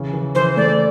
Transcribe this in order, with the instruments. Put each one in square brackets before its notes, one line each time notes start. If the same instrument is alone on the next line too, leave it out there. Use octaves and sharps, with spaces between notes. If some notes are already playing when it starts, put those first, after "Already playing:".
Already playing: [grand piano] C#3 E3
E3
[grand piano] E3 [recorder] C5
[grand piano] A3 [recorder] D5